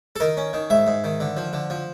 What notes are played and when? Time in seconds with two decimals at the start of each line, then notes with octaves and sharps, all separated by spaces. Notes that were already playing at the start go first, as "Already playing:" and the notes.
0.16 A4
0.20 D#3 A#4
0.37 C#4
0.53 D#3
0.70 G#2 E5
0.87 G#2
1.04 D#3
1.20 D3
1.37 F3
1.53 D3
1.70 F3